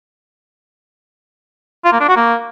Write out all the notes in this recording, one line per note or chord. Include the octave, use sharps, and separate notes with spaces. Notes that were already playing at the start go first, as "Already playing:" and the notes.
F4
A#3
D4
F#4
A#3